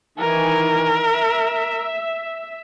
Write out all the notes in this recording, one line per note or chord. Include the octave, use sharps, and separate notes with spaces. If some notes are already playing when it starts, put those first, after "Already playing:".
D#3 E3 A#4 G#5
E5